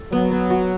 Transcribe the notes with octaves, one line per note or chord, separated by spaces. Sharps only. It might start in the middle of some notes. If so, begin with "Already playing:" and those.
Already playing: A4
F#3 B3
B3
F#4